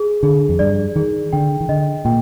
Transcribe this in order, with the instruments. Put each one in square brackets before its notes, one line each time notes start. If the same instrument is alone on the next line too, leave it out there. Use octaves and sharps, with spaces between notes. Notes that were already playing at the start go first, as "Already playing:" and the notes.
Already playing: [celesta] G#4
[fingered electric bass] D3 [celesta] G#4
[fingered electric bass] F2
[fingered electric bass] G2 [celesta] D5
[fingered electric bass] D#3 [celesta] G#4
[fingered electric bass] D3 [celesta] G5
[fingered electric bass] D#3
[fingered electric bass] D3 [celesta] D#5
[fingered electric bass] A#2 [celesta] G5